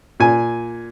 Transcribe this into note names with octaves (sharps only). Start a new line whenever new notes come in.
A#2 G#5